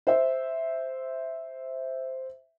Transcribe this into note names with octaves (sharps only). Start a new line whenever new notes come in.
C5 E5